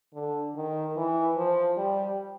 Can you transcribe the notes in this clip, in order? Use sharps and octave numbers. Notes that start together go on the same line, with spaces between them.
D3
D#3
E3
F3
G3